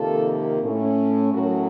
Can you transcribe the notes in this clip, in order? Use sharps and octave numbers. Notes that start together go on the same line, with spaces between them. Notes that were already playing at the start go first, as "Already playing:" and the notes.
Already playing: F2 C3 D#3 A#3 F4 A4
A2 A3 C#4
A2 F#3 A3 C#4 F#4 A#4